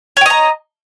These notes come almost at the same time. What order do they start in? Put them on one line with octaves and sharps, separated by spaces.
C#5 G5 D#5 A#5